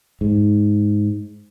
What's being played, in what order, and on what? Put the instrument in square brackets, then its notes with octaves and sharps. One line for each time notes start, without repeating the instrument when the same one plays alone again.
[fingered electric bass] G#2